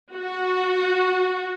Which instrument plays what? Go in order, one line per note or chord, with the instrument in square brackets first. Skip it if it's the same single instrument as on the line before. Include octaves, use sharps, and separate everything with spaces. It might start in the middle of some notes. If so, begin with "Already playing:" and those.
[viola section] F#4